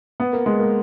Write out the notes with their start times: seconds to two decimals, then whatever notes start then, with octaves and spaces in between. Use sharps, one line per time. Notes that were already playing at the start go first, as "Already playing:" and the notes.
0.20 B3
0.33 A#3
0.46 G#3
0.60 A#3